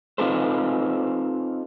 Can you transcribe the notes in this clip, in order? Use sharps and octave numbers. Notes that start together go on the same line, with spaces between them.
C4 D#4 F4 A4 B4 C5